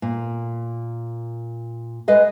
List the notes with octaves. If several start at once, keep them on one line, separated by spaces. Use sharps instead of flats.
A#2
G#3 B4 D#5 F5